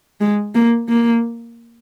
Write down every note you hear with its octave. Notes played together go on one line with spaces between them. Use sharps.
G#3
A#3
A#3